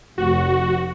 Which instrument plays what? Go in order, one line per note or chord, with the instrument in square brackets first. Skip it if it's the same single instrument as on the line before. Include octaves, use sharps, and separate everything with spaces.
[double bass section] F1 [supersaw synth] F#4